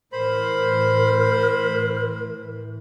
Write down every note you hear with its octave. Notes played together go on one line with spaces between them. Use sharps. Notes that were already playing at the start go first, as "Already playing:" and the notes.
A2 E3 A#4 C5 B5